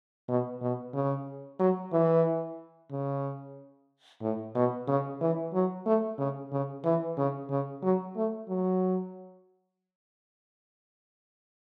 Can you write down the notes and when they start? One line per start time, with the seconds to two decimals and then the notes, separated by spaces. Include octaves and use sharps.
0.29 B2
0.62 B2
0.94 C#3
1.59 F#3
1.93 E3
2.91 C#3
4.22 A2
4.55 B2
4.88 C#3
5.21 E3
5.53 F#3
5.86 A3
6.18 C#3
6.52 C#3
6.85 E3
7.17 C#3
7.50 C#3
7.83 F#3
8.16 A3
8.49 F#3